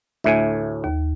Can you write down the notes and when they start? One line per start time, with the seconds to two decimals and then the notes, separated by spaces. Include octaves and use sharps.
0.24 D2 A2 E5 G#5
0.84 D#2